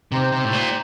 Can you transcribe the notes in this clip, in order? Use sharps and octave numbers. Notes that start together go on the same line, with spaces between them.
C3 D#4 G4 C5
C3
A2
A#2